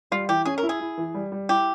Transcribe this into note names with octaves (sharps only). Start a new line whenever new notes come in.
G3 F4
E3 G4
C#4 G#4
A#4
E4
G#4
E4
E3
G3
G3
E4 G4